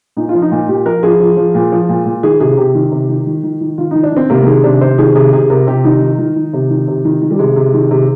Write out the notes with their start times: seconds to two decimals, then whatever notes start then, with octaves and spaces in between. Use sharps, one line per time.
0.17 A#2 D#4
0.29 F4
0.34 F3
0.42 D#4
0.51 A#2
0.68 A#2 G4
0.85 F3 A#4
1.03 F3 G#4
1.20 F3
1.37 F3
1.55 A#2
1.72 F3
1.89 A#2
2.06 A#2
2.23 D#3 G#4
2.40 C3 G#4
2.57 C3 G4
2.75 D#3
2.92 C3
3.09 D#3
3.26 D#3
3.43 D#3
3.61 D#3
3.78 D#3 F4
3.91 D#3 D#4
4.03 D4
4.12 D#3 C4
4.30 C3 A#3
4.42 A#3
4.47 D#3 G#3
4.64 C3 D4
4.81 C3 C5
4.98 D#3 G#4
5.15 C3 G#4
5.33 C3 G#4
5.50 C3 A#4
5.67 C3 G4
5.84 D#3 D#4
6.02 D#3
6.19 D#3
6.36 D#3
6.53 C3
6.70 D#3
6.88 C3
7.05 D#3
7.22 D#3
7.31 G3
7.39 C3 G#3
7.56 C3
7.74 D#3
7.91 C3